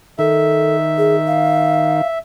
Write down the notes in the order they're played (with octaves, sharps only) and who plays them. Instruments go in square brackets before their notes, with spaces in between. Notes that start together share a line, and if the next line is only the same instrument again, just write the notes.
[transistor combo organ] D#3 [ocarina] A4 [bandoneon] E5
[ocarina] G#4
F5